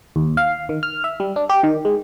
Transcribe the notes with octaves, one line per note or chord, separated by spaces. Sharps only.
D#2
F5
D#3
F6
E5
G3
D4
G4
D#3
G#3